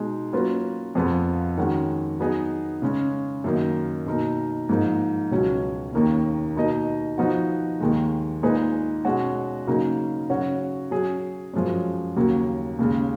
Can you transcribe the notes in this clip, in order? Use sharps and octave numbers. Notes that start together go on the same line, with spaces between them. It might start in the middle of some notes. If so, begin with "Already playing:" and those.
Already playing: B2 G#3 D#4
F#3 A#3 C#4 F4 B4
F2 F3 B3 F4 G#4
D#3 G#3 C#4 F#4
F#3 B3 D#4 G#4 D#5
C#3 G#3 C#4
F#2 D#3 A#3 D#4
B2 A#3 D#4 A#4
G#2 F3 A#3 D#4
C#2 B2 F#3 C#4
D#2 D#3 A#3 C#4
B2 A#3 D#4 A#4 D#5
F3 B3 D#4 F#4
D#2 D#3 G#3
A#2 G#3 D#4 G#4 B4
B2 G#3 C#4 F#4 C#5
C#3 F#3 A#3 D#4 G#4
C#3 F#3 C#4 F#4 C#5
F#3 C#4 G#4
F#2 F3 G#3 C#4
D#2 C#3 F#3 A#3 C#4
D#2 C#3 G#3